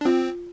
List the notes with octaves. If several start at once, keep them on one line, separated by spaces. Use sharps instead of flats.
D4
C4 F4